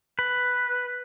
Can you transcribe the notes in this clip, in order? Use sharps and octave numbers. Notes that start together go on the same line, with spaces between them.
B4